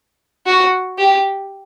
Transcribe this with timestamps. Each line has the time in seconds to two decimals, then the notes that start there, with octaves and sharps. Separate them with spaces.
0.46 F#4
0.98 G4